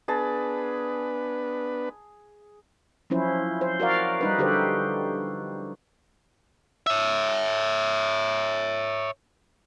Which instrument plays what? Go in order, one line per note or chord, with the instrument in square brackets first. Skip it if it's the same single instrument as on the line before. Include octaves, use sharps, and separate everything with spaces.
[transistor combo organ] B3 D4 B4 [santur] G#4 A5
[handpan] F3 F#3 C#4 E4 C5
C5
F#4 A#4 D5 F5
G3 D#4 B4
D3 F#4 G4 A4 B4 C5
[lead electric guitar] C#5 E5